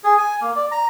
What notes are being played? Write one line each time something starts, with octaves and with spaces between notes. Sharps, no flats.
G#4
G#5
A#3
D5
A#5